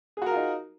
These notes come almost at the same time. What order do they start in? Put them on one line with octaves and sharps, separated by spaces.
G#4 F#4 A#4 F4 D#4